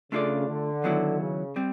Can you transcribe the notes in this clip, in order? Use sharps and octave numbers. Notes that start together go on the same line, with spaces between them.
C#3 A3 D4 F4 A4 D5
D3
D#3 F#3 B3 E4
C#3
G3 C4